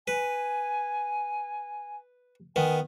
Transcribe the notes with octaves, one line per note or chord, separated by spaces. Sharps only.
B4 G#5
D#3 B3 G#5